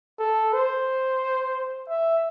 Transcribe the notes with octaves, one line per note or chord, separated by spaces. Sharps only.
A4
C5
E5